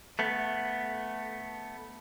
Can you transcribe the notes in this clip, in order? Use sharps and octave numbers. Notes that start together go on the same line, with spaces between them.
A3 B3